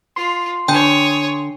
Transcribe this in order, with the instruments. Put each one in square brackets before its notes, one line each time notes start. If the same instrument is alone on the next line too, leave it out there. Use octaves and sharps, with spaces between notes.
[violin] F4 [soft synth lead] C6
[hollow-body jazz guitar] D3 [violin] C#5 D#6 [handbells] G5 G#5 G6